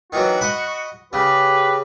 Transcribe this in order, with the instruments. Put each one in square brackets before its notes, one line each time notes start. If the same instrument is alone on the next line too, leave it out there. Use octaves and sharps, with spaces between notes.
[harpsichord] D#3 E3 F#3 [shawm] F#4
[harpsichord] D#5 F#5 B5
[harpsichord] C#3 [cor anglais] G4 [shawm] B4